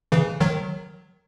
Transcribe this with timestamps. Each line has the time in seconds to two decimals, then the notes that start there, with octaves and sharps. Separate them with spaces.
0.12 C#3 E3
0.41 D#3 F#3